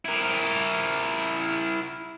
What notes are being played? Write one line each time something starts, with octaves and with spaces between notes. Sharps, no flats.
E4 A#4